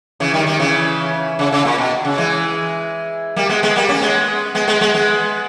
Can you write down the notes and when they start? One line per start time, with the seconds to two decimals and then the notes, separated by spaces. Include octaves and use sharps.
0.20 C#3 E3
0.34 D#3 G3
0.47 D#3 G3
0.60 C#3 E3
1.39 C#3
1.52 C#3
1.65 A#2
1.78 B2
2.05 C#3
2.18 E3 G#3
3.36 G3 A#3
3.49 G#3 B3
3.63 G#3 B3
3.76 G3 A#3
3.89 A#3 C#4
4.02 G#3 B3
4.55 G#3 B3
4.68 G#3 B3
4.81 G#3 B3
4.94 G#3 B3